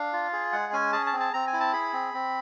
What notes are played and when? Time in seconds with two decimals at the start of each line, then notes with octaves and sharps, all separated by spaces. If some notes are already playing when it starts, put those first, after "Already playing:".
Already playing: D4 F5
0.13 F4
0.33 G#4
0.52 G#3 F#5
0.73 C#4 G#5
0.93 G#4 A5
1.06 A5
1.13 C4
1.20 A5
1.33 C4 A#5
1.47 G#5
1.53 E4
1.60 A5
1.73 G#4 B5
1.93 C4
2.14 C4